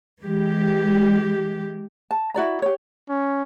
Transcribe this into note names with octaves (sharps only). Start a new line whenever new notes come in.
E3 G#3 G4
A5
E4 F#4 D5 A#5
G4 C#5
C#4